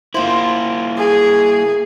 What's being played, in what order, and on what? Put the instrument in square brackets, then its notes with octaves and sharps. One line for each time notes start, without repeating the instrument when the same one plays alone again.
[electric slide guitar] A#3 E4 [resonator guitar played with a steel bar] F4 C5
[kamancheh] G#4